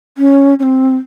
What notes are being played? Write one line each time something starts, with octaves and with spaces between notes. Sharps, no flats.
C#4
C#4
C4